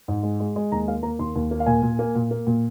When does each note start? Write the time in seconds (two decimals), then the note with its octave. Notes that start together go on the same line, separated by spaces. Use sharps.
0.08 G#2
0.23 G#3
0.40 G#3
0.56 G#3
0.72 D#2 A#5
0.88 A#3 F5
1.03 A#3 A#5
1.19 D#2 C6
1.36 D#2
1.51 A#3
1.60 F5
1.66 A#2 G#5
1.82 A#2
1.99 A#3
2.15 A#2
2.31 A#3
2.47 A#2